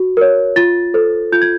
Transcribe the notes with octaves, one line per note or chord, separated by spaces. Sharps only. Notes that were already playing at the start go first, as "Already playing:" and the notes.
Already playing: F#4
A#4 C#5
F4 A6
A4 C5
F4 G6
G#6